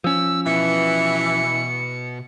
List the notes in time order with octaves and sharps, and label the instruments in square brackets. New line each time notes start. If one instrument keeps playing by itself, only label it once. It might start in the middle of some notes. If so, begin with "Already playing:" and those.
[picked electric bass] F3 C#4 [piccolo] E6
[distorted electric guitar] B2 [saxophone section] E3 [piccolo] C#7